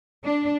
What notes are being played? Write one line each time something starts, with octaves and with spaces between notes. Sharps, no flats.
D4